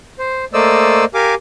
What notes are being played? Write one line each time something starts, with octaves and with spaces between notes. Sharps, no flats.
C5
A3 A#3 C5 D5 D#5 E6
G4 A#4 F5 G#5 D6